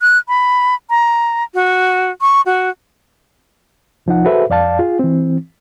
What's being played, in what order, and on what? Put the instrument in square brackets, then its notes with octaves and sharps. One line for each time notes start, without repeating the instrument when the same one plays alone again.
[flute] F#6
B5
A#5
F#4
C#6
F#4
[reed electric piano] C2 F3 D#4 F#5
F#4 G#4 A4 B4 C5 E5
F2 D5 F5 A5
F4 G#4
E3 C4